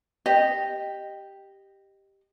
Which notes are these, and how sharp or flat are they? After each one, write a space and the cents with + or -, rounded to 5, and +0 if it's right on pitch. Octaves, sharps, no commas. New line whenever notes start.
G4 +0 D#5 -15